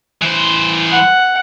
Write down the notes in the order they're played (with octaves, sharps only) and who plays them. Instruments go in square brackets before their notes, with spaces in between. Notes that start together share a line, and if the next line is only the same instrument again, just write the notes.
[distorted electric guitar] E3 C5
[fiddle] F#5